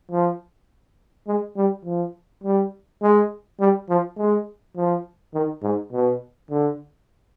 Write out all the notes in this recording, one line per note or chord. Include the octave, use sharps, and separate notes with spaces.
F3
G#3
G3
F3
G3
G#3
G3
F3
G#3
F3
D#3
G#2
B2
D3